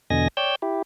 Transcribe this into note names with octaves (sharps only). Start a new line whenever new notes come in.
E2 B2 D3 D#5 G#5 A#6
C#5 D5 G5 E6 G6
E4 G4